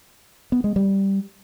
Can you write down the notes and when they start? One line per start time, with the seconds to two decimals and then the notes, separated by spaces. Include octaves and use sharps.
0.52 B3
0.64 G#3
0.76 G3